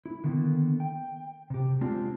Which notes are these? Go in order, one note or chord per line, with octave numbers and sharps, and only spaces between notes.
E4
D3 D#3 A#3 B3
G5
C3 G4
G#3 C4 D4 F4 G4